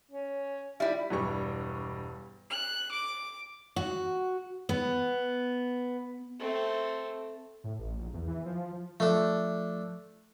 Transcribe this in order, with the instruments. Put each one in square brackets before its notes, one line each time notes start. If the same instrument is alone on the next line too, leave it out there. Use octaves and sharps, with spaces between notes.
[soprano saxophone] C#4
[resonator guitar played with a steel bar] G3 E4 [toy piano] F4 E5
[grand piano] E1 G2 G3 C#6
[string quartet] F#6
D6
[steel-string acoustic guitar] F#4
B3
[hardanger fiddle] A3 C4
[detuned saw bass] A2
A1
A#1
E2
E3
F3
[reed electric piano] F3 [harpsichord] A3 D4